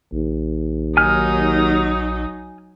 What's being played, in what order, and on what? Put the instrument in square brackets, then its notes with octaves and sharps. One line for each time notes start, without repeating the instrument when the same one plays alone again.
[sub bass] A#1 [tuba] D#2
[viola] F#3 D#4 [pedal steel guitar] G#5 F6